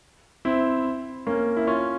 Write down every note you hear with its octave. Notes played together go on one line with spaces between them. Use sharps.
C4 E4
A#3 C#4
E4
C#4 F4